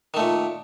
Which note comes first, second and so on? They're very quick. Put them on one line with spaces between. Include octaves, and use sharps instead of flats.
D#3 A3 A#2